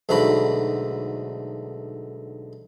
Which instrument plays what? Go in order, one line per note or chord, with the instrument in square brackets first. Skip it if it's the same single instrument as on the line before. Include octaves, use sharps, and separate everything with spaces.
[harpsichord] B1 G#2 D3 A3 F#4 B5